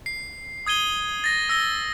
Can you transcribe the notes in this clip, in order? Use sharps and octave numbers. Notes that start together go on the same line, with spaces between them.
C7
D#6 G#6 D#7 G7
A6 A#6
E6 A#6 G7